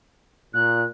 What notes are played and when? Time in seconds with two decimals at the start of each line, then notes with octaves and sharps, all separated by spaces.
0.53 A#2 F#6